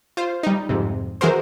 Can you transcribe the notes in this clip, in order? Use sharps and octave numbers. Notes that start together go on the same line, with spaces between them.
F4 C5
G3 D#4
F2 G#2 C3
E3 G#3 F#4 A#4 C5